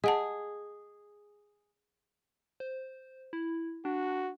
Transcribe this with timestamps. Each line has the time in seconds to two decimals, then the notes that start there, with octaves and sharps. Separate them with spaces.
0.04 G#4 D#5 F#5 A5
2.60 C5
3.33 E4
3.85 D4 F#4